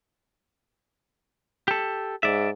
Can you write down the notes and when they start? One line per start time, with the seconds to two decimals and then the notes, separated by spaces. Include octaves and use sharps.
1.68 G4 A4
2.23 G#2 D5 E5